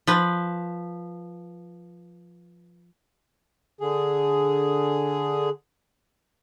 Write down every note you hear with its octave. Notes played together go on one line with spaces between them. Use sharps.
F3 B4
D3 G#4